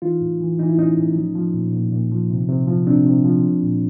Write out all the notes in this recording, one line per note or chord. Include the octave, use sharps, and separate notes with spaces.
E3 D#4 F4
A2
E3
E3 D#4
E4
A2 C#4 D#4
A2
F3
F3
A#2
A#2
A#2
F3
C3
C3
F3
C3 C4 D4
C3
F3
F3
A#2